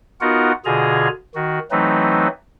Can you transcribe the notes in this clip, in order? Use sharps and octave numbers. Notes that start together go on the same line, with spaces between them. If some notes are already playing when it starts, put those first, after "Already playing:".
B3 D#4 F4 F#4 A#4 F#5
B2 D3 F4 G#4 G#5 A#5
D#3 F#4
E3 F#3 A3 C4 D#4 B4